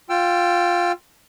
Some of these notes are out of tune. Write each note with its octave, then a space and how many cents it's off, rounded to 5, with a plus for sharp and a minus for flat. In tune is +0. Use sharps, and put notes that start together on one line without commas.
F4 +10 G5 +0 E6 +35